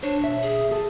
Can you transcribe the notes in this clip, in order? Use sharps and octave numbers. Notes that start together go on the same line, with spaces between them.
D4 C5 C#5
B2 E5
G#4
G#4 A4 A5